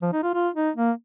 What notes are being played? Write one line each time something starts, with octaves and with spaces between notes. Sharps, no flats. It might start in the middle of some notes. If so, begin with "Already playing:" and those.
F3
D#4
F4
F4
D#4
A#3